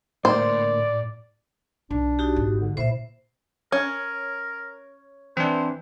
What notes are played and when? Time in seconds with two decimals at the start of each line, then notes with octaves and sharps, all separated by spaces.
0.25 D2 A2 A#3 C5 D5
1.90 B1 D4
2.19 D#4 F#4 G4
2.36 G#1
2.60 D3
2.77 A#2 C#3 E4 C5 E5
3.72 C#4 A#4 C#5
5.37 E3 C4 D4 C5